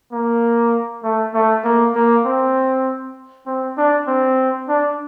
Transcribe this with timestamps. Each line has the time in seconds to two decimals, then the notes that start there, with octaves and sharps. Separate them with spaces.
0.12 A#3
1.03 A3
1.34 A3
1.64 A#3
1.95 A#3
2.25 C4
3.46 C4
3.77 D4
4.07 C4
4.68 D4